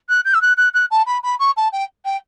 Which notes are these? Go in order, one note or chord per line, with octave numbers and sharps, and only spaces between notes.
F#6
G6
E6
F#6
F#6
F#6
A5
B5
B5
C#6
A5
G5
G5